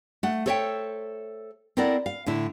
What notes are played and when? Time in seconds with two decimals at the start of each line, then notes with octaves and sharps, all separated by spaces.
0.23 A3 F#5
0.46 A4 C5 C#5 D#5 E5 G5
1.77 C4 E4 A4 A#4 D5 F#5
2.06 F5
2.26 A2 D3 E4